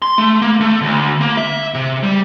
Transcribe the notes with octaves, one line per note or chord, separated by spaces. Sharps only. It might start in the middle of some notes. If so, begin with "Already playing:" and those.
C6
A3
A#3
A3
D2
A#3
E5
C3
G3